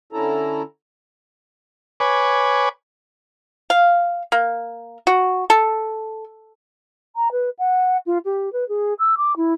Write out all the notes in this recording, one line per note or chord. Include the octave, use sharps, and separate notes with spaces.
D3 C#4 E4 A4 A#5
B4 C#5 G#5 D6
F5
A#3
F#4
A4
A#5
B4
F#5
F4
G4
B4
G#4
E6
D6
E4